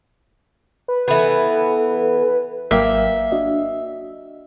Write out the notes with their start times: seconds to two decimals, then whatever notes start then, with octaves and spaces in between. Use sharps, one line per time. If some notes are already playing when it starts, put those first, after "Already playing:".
0.88 B4
1.08 E3 B3 A4
2.71 G#1 F#3 A#3 E5 G5
3.32 D4 F#4 D#5